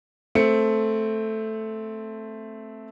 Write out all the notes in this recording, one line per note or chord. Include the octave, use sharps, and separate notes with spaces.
A3 C4 C#7